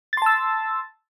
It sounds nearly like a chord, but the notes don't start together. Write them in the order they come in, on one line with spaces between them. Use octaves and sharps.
A6 C6 A5 E6